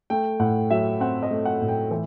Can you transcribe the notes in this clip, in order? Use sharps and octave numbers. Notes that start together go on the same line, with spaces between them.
A3 G5
A2 F#5
F#3 E5
C4 F#5
D#5
A3
F#5
A2
G5
E3